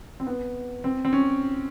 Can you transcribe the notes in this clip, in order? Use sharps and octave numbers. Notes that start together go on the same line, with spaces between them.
C4
B3
C4
C4
C#4